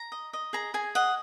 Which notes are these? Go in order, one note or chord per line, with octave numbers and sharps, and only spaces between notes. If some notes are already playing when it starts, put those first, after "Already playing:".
Already playing: A#5
D#5
D#5
G#4 A#5
G#4 G#5
D#5 F#5